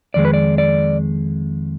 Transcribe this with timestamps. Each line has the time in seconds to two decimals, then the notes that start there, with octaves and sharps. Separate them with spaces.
0.14 F2 D#3 G#3 D5
0.25 B4
0.34 D5
0.58 D5